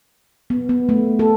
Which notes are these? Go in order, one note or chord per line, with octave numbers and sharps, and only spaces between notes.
B3
B3
A3
A4